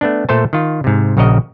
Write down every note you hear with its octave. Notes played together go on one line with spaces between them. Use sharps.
A3 B3 D4
A#2 A3 A4 C5 A5
D#3 F4
G#2 C3
A#1 C#3 F#4 A#4 D#5